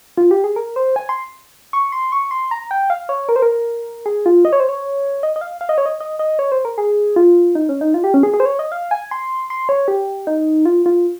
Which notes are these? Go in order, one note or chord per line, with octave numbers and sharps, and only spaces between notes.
F4
G4
G#4
A#4
C5
G#5
C6
C#6
C6
C#6
C6
A#5
G5
F5
C#5
A#4
C5
A#4
G#4
F4
D#5
C#5
C5
C#5
D#5
D#5
F5
F5
D#5
C#5
D#5
D#5
D#5
C#5
C5
A#4
G#4
F4
D#4
C#4
D#4
F4
G4
C#4
G#4
G#4
C5
C#5
D#5
F5
G#5
C6
C6
C#5
G4
D#4
F4
F4